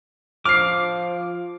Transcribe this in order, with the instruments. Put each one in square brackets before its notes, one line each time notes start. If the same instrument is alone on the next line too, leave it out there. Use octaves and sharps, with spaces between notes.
[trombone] F3 [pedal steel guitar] D6 [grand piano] F6 C7